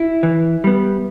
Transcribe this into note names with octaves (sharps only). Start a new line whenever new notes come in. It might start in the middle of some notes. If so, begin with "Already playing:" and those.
Already playing: E4
E3
G3 B3